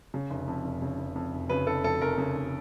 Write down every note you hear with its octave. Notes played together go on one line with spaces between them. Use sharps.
C#3
F1
F2
F1
C#3
F1
F2
F1
C#3 B4
F1 A4
F2 A4
F1 A#4
C#3
F1